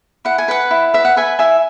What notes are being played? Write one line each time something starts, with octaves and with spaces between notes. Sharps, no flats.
E4 F#5
G#5
B4 F#5
E4
B4 E5
F#5
B4 E5 G#5
E4 E5 G#5